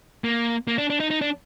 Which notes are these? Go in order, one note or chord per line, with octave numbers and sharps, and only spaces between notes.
A#3
A#3
D4
D4
D#4
D#4
D4